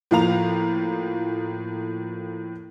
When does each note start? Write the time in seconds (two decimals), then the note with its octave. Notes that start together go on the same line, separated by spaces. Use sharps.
0.11 A2 F3 A#3 F5 A#5 F7